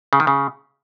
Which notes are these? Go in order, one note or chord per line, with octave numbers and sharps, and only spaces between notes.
C#3
D#3
C#3